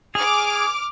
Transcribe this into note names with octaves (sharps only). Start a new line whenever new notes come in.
G#4 D6 F6